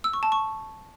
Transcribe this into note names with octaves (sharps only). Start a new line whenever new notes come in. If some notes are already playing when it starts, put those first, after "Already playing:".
E6
C#6
A5
C#6